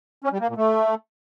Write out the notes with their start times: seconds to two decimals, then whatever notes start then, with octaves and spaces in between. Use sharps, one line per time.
0.24 C#4
0.32 G3
0.41 A#3
0.49 A#2
0.57 A3